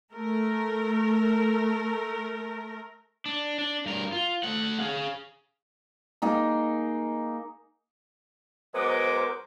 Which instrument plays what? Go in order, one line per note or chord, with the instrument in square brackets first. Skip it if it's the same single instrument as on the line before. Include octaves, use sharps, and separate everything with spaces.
[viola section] A3 A#4
[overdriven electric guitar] D4
D4
G2 A#4
F4
A3 F#5
G#4 F5
[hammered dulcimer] A#3 D#4 G#4
[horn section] F#3 G#3 B3 [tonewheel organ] A#4 C5 [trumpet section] D#5 D6